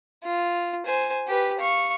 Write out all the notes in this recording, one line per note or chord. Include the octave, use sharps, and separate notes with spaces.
F4
C5 G#5
G4 B4
F5 C#6